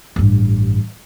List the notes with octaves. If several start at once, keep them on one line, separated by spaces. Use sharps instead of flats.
A1 G2